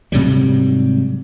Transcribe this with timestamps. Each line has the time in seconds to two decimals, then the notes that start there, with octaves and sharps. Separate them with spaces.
0.12 G#2 C3 F#3 G3